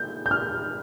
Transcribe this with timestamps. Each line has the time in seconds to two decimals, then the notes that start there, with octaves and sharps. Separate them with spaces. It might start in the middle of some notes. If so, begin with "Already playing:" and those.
Already playing: G6
0.26 G6
0.31 F6